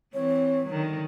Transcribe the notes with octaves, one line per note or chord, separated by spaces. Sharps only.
E3 C4 C#5
D3 D#3 F#3